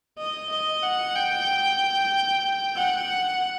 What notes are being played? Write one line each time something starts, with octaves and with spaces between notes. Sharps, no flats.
D#5
D#5
F#5
G5
F#5